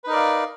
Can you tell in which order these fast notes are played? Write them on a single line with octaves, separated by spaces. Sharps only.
B4 D#4 A#4 D5 F5